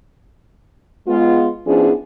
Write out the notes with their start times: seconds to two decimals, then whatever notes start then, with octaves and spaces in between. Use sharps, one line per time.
1.08 G#3 B3 F4
1.66 F3 B3 C#4 D4 E4 G#4